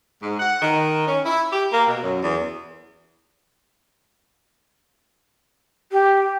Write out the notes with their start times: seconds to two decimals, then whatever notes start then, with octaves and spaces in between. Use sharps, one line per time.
0.22 G#2
0.40 F#5
0.61 D#3
1.07 C#4
1.26 E4
1.52 G4
1.72 A#3
1.87 B2
2.02 F#2
2.23 E2
5.92 G4